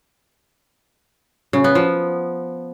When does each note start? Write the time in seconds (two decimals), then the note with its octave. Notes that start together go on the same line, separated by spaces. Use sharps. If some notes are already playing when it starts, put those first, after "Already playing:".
1.53 C#3
1.64 B3
1.75 F3